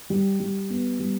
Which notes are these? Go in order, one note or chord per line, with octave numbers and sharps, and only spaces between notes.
G3
G3
B3
G3